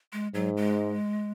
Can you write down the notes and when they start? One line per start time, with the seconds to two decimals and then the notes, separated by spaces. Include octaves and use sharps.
0.13 G#3
0.34 G#2 F#3
0.57 G#3